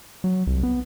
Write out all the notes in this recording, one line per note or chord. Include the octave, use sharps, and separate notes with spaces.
F#3
C2
B3